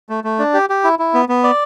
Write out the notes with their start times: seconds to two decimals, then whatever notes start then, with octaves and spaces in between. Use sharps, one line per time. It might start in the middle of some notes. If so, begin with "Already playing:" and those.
0.09 A3
0.24 A3
0.39 D4
0.54 G4
0.70 G4
0.84 E4
0.99 E4
1.14 B3
1.29 B3
1.44 D5